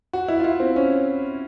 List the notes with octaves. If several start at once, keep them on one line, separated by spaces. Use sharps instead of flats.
F#4
E4
F4
E4
C4
C#4